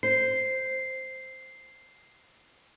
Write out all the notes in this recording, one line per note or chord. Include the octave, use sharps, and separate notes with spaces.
C5 C7